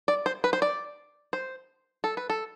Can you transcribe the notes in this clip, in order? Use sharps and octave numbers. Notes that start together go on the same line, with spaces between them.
D5
C5
B4
C5
D5
C5
A4
B4
A4